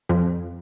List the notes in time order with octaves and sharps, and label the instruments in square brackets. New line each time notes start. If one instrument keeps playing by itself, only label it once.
[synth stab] F2